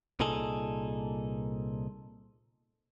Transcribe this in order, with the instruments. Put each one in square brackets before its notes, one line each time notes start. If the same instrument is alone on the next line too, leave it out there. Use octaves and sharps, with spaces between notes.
[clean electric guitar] C2 A#2 D#4 G#4 A4